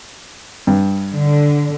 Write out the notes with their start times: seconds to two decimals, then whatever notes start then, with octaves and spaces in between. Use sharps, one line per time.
0.67 G2
1.15 D3